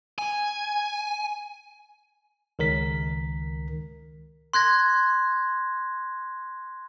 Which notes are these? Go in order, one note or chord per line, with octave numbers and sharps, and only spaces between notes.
G#5
C#2 D#3 A#4 B6
C6 F#6 G#6 A#6